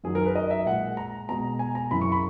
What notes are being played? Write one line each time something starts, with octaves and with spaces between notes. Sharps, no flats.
F#2 D#3 F#3 G#4
A#4
B4
D#5
E5
A#2 G#3 F#5
A#5
B2 G#3 A#5
G#5
A#5
F#2 C#3 E3 B5
C#6
B5